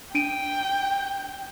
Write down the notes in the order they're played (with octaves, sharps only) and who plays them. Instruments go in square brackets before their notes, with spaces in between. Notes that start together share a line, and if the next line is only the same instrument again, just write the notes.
[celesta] D4 D7 D#7 [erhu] G5